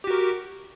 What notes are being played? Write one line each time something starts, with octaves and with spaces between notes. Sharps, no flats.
F#4 G4 A#4